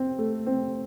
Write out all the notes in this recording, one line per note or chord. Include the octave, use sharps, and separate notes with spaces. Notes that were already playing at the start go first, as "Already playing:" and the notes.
Already playing: C4
A3
C4